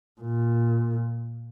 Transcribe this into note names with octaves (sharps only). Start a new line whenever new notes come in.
A#2